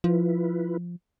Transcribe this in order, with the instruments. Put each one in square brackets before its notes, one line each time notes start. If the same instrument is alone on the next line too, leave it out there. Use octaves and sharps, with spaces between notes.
[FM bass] F3 [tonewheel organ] E4 F4 B4